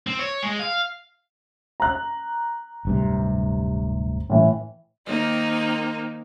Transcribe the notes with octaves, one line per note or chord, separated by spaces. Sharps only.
C4
C#5
G#3
F5
A#5 F#6
D1 G2 C3
A2 E3
D#3 A#3 C4 D#4